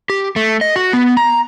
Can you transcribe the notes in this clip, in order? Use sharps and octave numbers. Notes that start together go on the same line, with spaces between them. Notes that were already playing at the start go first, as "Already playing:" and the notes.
G4
A3
D#5
F#4
B3
A#5